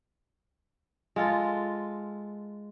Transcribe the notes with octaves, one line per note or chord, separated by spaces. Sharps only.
G#3 F4 A4